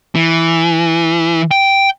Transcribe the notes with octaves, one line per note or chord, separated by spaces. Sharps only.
E3
G5